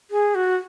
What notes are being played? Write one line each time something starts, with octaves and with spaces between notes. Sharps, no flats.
G#4
F#4